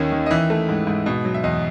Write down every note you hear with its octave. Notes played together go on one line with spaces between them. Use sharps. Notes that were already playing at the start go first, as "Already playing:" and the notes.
Already playing: D#2 D#3 C#4
D#3
D#5
E3 E5
A3
G#2
G#2
B2
F#3
E5
E2 D#5